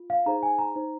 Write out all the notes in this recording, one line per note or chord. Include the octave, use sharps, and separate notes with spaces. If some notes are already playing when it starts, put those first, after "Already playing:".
Already playing: F4
F5
D#4 G#4 C5 A#5
G#5
A#5
D#4 C5